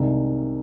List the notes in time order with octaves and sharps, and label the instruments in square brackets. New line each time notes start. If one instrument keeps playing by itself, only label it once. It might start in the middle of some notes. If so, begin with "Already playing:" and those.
Already playing: [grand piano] C2 C3 D#3 G#3